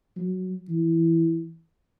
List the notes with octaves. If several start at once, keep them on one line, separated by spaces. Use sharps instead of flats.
F#3
E3